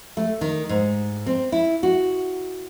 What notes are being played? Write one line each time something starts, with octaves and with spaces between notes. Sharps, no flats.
A3
D#3
G#2
C4
E4
F#4